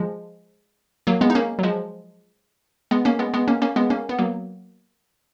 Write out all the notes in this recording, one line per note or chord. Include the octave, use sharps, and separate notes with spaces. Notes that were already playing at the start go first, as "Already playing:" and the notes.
Already playing: F3 G#3
F#3 A#3
G#3 B3
D#4
A#3 C#4
F#3
F3 G#3
G#3 B3
A#3 C#4
G#3 B3
G#3 B3
A#3 C#4
A#3 C#4
G#3 B3
A#3 C#4
B3
F#3 A#3